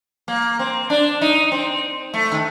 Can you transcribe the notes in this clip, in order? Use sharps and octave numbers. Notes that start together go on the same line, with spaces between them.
A#3
C4
D4
D#4
C4
A3
D#3